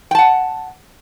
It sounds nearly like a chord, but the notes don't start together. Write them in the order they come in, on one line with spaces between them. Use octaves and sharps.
G5 A5 F#5